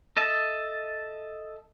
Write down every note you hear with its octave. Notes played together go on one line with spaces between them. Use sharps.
A4 D#5 E5 A5